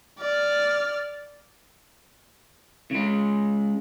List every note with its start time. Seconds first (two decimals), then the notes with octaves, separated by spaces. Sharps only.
0.19 D5 F6
2.91 C#3 G#3